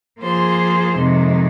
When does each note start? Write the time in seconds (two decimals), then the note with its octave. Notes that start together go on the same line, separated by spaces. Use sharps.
0.21 F3 A#3 F4 G#4 C5
0.96 F2 C3 D#3 G#3